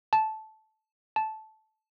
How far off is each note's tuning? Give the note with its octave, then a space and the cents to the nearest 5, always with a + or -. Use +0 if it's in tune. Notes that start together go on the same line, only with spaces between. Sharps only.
A5 -10
A5 -10